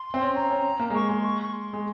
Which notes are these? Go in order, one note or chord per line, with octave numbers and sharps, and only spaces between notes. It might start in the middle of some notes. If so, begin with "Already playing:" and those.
Already playing: C6
C4
C#4
C#4 A#5
C#4
A#3
G#3
A#3 C#6
G#3 C6
C#6
C#6
C6
G#3